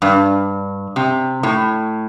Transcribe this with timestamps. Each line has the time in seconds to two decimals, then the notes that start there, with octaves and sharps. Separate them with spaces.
0.02 G2
0.96 C3
1.43 A2